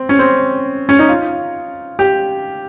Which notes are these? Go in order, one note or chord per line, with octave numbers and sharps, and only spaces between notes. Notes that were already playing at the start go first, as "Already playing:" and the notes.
Already playing: C4
C#4
C4
C#4
D#4
F4
G4